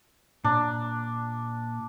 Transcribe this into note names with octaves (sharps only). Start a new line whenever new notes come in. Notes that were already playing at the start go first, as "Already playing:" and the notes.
A#2 D4 A#5